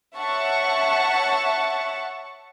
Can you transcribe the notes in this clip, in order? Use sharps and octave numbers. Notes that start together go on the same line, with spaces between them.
C#5 E5 F#5 A5 C#6